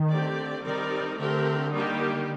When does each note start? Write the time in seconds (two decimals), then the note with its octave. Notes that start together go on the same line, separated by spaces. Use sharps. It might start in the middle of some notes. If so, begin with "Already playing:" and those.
Already playing: D#3
0.10 D3 A3 C4 G4 D5
0.64 D#3 G3 C4 D#4 A#4 D5
1.18 D3 A3 C4 G4 A#4
1.72 D#3 G3 A#3 D#4 G4